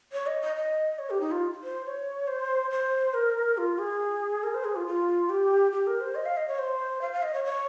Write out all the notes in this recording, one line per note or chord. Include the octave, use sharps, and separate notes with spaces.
C#5
D#5
D#5
D#5
C#5
G4
D#4
F4
C5
C#5
C5
C5
A#4
F4
G#4
A#4
C5
G#4
F4
F4
G4
G4
A#4
C5
D#5
F5
D#5
C#5
C5
F5
F5
D#5
C#5
C#5